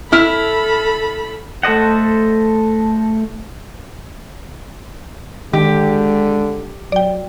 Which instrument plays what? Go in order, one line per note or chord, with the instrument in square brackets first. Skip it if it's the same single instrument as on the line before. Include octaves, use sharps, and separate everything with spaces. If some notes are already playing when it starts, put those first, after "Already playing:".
[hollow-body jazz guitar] E4 [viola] A4 B5 [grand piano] F6
[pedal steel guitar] A3 A4 C5 D#5 F#5
[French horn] D3 [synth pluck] D#3 [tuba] G#3 [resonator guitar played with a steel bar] G4
[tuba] F#3 [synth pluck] D5 G5